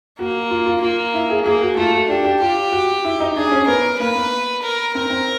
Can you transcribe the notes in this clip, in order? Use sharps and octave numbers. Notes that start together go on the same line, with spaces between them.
A#3 F#4
F4
F4
A#3 F4
E4
G#4
A#3 G#4
F#4
A3 F4
F#4
D4 G4
G4
F4 G4
F#4
E4
D#4
D4 G#4
C#4
B3 A#4
A#3 B4
B3
A#4
C4 A#4
C4